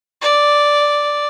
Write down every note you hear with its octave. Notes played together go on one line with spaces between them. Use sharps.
D5